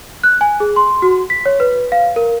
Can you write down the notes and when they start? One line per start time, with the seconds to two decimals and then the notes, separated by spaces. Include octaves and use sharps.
0.24 F#6
0.41 G#5
0.60 G#4
0.76 C6
1.02 F#4
1.30 B6
1.46 C#5
1.60 B4
1.92 F5
2.16 A#4